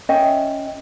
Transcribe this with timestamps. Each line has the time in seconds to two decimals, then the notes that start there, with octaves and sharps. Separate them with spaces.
0.09 C#4 D#5 E5 G5